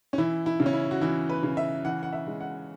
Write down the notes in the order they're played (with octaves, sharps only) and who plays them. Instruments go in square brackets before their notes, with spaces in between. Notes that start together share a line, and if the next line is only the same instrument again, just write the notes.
[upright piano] C#4
E3 E4
E4
C#3
C#4
E4
F#4
E3 E4
B4
C#3
E5
E3 F#5
F#5
E5
G#3
F#5